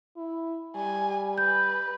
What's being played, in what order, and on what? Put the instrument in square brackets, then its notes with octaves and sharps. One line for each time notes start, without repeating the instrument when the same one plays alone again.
[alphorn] E4
[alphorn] G3 [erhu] G#5
[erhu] B4 [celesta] G6